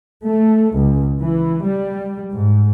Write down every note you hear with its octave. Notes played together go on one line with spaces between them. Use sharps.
A3
C#2
E3
G3
G#2